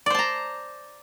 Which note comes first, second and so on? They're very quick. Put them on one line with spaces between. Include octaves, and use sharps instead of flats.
D5 C5 A5 A#5